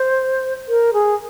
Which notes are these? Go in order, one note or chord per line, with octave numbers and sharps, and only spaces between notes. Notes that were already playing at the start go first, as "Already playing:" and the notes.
Already playing: C5
A#4
G#4